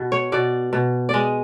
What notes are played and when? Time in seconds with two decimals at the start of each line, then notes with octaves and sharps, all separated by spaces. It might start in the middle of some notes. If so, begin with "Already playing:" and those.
Already playing: B2
0.12 C#5
0.32 B2 D5
0.73 B2
1.09 G#3 D5 D#5